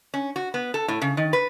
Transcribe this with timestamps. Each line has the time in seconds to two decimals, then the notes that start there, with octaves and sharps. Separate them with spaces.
0.14 C#4
0.36 F#4
0.54 B3
0.74 A4
0.88 A2
1.02 C#3
1.17 D#3
1.33 B4